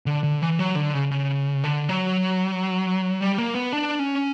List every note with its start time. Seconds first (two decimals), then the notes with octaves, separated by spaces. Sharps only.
0.06 D3
0.23 D3
0.42 E3
0.59 F#3
0.76 D3
0.94 C#3
1.11 C#3
1.64 D3
1.89 F#3
3.21 G3
3.38 A#3
3.55 B3
3.73 D4
3.99 C#4